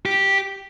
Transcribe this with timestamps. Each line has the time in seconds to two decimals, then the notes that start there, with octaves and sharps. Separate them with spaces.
0.05 G4